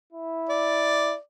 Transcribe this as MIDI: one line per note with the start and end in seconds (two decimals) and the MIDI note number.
0.13 1.15 64
0.49 1.18 74